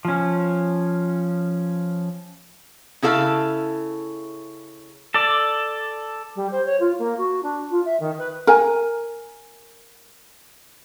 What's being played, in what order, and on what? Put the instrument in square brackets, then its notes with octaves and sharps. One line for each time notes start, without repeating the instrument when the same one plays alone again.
[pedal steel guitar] F3 C#4
[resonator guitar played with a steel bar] C#3 E4 A4 F5
[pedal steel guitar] A4 D5
[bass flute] G3
C5
C#5
F4
A#3
F#4
D4
F4
E5
D#3
B4
[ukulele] A#4 G#5